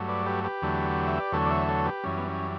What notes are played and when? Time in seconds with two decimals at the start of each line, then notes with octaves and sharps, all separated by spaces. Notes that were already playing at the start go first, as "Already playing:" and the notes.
Already playing: G2 F#3 A3
0.08 B4 D5
0.26 G4 B4
0.44 G4 B4
0.62 E2 D3 F#3 A3
1.07 E5
1.20 D5
1.32 E2 D3 F#3 A3 A4 C#5
1.45 D5
1.51 C#5 E5
1.68 A4 C#5
1.86 G4 B4
2.04 F#2 E3 G3 C#4
2.18 B3
2.28 C#4